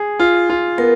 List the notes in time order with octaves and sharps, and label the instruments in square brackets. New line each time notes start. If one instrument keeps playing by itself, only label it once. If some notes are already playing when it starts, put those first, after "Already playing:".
Already playing: [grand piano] G#4
F4
F4
[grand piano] B3 [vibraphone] A#4